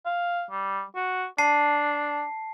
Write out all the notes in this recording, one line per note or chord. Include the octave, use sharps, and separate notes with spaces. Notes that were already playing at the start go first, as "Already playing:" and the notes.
F5
G3
F#4
D4 A5 C7